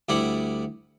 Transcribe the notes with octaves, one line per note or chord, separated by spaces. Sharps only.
D2 G3 E4 D5 F#5